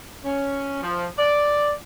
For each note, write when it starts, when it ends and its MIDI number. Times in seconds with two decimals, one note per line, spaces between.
0.24 0.80 61
0.82 1.05 53
1.18 1.71 74